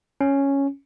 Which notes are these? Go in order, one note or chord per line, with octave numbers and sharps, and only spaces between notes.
C#4